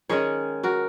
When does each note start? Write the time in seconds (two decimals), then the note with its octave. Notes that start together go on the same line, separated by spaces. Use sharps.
0.09 D#3 G#3 C#4 G#4 C#5
0.63 F#4 A#4